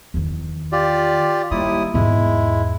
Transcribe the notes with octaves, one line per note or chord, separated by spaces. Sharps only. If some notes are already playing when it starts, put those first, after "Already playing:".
E2 D#3
F4 G4 D5
D#2 G3 G#3 E4 D#6
E2 G#2 G#3 E4